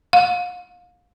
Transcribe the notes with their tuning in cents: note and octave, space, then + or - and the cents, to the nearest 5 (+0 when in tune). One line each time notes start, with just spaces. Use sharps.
F5 +30